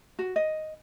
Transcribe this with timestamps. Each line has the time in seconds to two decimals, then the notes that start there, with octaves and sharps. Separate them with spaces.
0.19 F#4
0.36 D#5